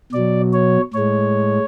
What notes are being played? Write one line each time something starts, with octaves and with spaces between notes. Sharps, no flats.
B2 F#3 D5
C#5
A2 G#3 C#5